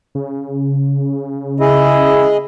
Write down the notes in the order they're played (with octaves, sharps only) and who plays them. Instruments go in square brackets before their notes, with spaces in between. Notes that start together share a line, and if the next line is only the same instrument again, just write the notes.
[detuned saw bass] C#3
[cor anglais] E4 [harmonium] G#4 D#5